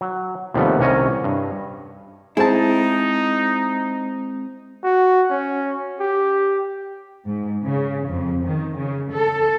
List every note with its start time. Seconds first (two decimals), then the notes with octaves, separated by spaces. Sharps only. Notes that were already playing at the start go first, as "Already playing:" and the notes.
0.01 F#3
0.54 D#2 C3 F3 G3 A3 B3
0.79 C2 C3 D#3 C#4 C#5 D#5
1.24 G2
2.37 G#3 C4 D#4 E4 G#4 C5 A5
4.84 F#4
5.30 C#4
6.00 G4
7.25 G#2
7.63 C#3
8.08 F2
8.45 D#3
8.76 C#3
9.12 A4